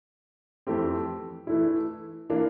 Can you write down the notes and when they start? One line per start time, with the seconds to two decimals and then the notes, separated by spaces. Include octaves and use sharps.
0.67 F2 E3 A3 C4 G4
1.47 E3 A3 E4
2.30 E3 A#3 D4